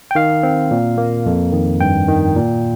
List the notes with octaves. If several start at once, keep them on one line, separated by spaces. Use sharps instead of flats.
G5
D#3 F5
C4
A#2
A#3
F2
D#3
G2 G5
D#3
A#2